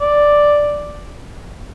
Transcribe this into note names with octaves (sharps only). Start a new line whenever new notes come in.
D5